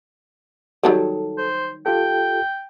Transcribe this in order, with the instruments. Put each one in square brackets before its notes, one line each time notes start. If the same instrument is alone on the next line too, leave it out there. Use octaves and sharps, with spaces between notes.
[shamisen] D#3 F#3 G3 [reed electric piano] A4
[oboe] C5
[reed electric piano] F4 G4 A4 [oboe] G5